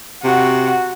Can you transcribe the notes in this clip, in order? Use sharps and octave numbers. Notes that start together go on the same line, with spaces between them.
C3 F#4